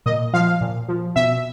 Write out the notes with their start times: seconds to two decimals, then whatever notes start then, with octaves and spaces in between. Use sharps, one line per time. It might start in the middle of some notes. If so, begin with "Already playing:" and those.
0.06 A#2 D#5
0.33 F3 F5
0.61 A#2
0.88 F3
1.16 B2 E5